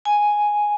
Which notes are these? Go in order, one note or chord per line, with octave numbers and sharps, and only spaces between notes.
G#5